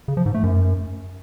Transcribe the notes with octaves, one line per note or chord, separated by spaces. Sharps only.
C#3
F3
G#2
A3
F#2